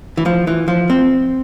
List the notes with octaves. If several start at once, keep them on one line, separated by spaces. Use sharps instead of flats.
E3
F3
E3
F3
C4